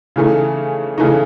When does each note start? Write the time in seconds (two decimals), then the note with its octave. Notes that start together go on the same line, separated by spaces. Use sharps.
0.16 C#3 E3 A3 D#4
0.98 C#3 E3 A3 D#4